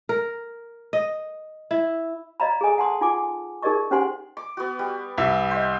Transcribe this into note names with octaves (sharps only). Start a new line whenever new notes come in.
A#4
D#5
E4
D5 D#5 F5 A#5 B5
G#4 A4 D#5 G#5 D#6
F#5 A5 C6 D#6
D#4 F4 F#5 G#5 D6
D#4 G#4 A#4 D5 D#5 C#6
C#4 G4 C5 F#5 G#5 C6
D6
B3 F#4
G3
C2 E5 E6
C5 D#5